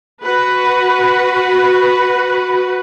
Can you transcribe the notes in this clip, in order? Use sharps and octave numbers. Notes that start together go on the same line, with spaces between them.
F#4 B4